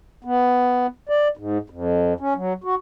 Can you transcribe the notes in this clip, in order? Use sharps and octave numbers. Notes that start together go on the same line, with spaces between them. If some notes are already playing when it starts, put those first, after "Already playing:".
B3
D5
G#2
F2
C#4
F#3
F#4